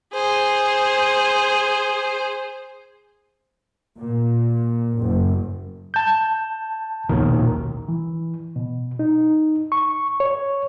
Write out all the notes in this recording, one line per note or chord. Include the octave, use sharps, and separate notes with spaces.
G#4 C5
A#2
F#1
A5 G6
A#1 D#2 B2 D#3
E3
B2
D#4
C#6
C#5